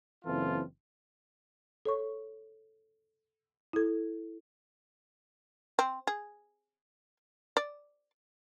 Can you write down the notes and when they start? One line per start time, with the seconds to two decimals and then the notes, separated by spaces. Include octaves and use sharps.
0.25 F#1 E3 C4 F4 A4
1.85 A4 C#5 C#6
3.73 E4 A4
5.79 C4
6.07 G#4
7.57 D5